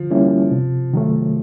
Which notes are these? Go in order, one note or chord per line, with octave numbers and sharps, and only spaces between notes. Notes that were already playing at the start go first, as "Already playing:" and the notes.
Already playing: D3 F3
G3 A#3 C#4 E4
C3
D#3 F#3 A3